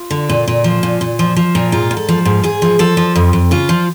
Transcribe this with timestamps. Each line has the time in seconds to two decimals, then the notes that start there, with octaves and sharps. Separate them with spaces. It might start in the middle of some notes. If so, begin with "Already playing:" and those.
Already playing: F4
0.11 D3
0.29 A#2
0.48 A#2
0.64 F3
0.83 A#2
1.01 A#2
1.19 F3
1.36 F3
1.55 A#2
1.72 G#2 F4
1.91 G#2
1.97 A4
2.09 F3
2.25 G#2
2.43 G#2 G#4
2.62 F3
2.79 F3 A4
2.97 F3
3.15 F2
3.33 F2
3.51 C#3 F4
3.69 F3